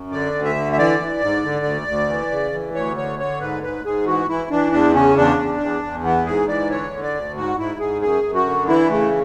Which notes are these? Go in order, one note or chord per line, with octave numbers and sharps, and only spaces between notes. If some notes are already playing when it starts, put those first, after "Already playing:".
Already playing: F#2
D3 D5
D2
E5
D3
E5
E3 D5
E3
G#2
D3
D2
D2
E3
C#3
E3
D2 C#5
D3 C#5
D3 C#5
G#2 B4
G#2 B4
G#2 G#4
E3 F#4
E3 E4
E3 D4
E2 D4
C#3 C#4
E2 D4
E2
E2
E2
E3 B3
G#2 G#4
E3 D5
D3 C#5
D3
D5
D2
G#2 F#4
G#2 E4
G#2 G#4
F#2 G#4
F#2
F#4
D3
E3 E4
C#3 A3